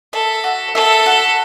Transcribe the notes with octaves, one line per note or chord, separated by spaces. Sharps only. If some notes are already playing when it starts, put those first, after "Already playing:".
A4 E5
F#4
A4 E5
F#4